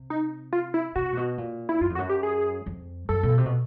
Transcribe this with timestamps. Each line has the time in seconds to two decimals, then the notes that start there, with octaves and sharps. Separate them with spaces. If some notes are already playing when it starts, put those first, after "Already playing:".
Already playing: C3
0.10 D#4
0.53 F4
0.74 E4
0.96 C3 F#4
1.13 A#2
1.17 B2
1.38 A#2
1.69 E4
1.81 F#2 F4
1.90 F2
1.95 F#4
1.98 F#2
2.10 G4
2.23 G#4
2.66 F2
3.09 F#2 A4
3.23 B2
3.38 C3
3.46 B2